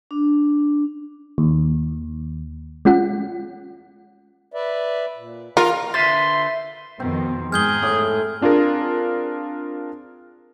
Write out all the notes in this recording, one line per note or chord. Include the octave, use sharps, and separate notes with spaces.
D4
D#2
G#3 C#4 F4 F#5
B4 D5 E5
A#2
F4 A#4 A#5
D3 B4 C5 E5 C6 A6
F2 B2 D#3 C4
G#2 G#4 F6 G6 G7
A2 D6
C4 D4 F4 G#4 A#4